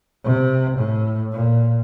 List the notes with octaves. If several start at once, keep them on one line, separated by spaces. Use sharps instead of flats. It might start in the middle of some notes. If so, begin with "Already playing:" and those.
C3
A2
A#2